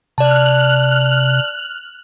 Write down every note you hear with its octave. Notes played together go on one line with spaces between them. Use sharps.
C3 D5 A5 F6 F#6